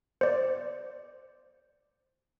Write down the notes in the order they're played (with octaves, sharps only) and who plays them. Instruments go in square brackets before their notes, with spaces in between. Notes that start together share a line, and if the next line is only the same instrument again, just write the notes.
[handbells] C5 D5